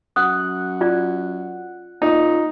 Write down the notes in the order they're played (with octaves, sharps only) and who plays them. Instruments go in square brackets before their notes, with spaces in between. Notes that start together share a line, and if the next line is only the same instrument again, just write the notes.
[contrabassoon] F#2 [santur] F#5 [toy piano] D#6
[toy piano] F4 D5
[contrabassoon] A#2 [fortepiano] D#4